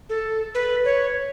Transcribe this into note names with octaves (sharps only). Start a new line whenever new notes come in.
A4
B4
C#5